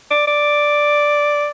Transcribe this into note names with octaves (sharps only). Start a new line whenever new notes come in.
D5
D5